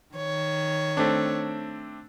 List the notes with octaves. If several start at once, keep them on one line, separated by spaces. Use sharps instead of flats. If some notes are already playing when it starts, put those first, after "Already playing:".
D#3 C#5
A3 C4 D4